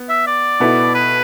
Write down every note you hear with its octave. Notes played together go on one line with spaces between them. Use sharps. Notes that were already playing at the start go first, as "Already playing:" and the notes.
Already playing: B3
E5
D5
B2 B3 E4 A4
B4